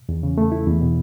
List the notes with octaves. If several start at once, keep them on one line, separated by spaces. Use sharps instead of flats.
E2
C#3
A3
E4
E2
B2